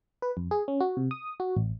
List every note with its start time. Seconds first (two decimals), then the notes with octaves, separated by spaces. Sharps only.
0.22 B4
0.37 F2
0.51 G#4
0.68 C#4
0.80 F#4
0.97 C3
1.11 D#6
1.40 F#4
1.57 A1